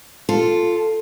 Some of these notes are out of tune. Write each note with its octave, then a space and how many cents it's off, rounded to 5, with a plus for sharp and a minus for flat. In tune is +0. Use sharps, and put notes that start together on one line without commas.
F4 +0 A4 +0